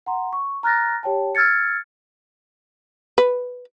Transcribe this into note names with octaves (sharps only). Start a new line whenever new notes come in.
F#5 A#5 C6
C#6
A#5 F6 F#6 A6 A#6
G4 C#5 G5 A5
E6 F6 G#6 A6 C#7
B4